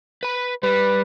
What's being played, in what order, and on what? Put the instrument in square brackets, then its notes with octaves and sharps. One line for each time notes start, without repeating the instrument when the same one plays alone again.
[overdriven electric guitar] B4 B5
[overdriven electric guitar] G3 [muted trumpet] B4